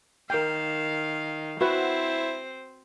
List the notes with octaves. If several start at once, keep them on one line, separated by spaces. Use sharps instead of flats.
D#3 A#4 F5 G5
C4 E4 F#4 B4 C5 F#5